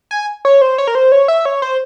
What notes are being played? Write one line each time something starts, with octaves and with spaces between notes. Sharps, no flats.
G#5
C#5
C5
C#5
A#4
C5
C#5
E5
C#5
C5